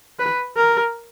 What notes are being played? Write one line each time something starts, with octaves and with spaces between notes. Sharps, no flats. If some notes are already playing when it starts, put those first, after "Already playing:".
B4
A#4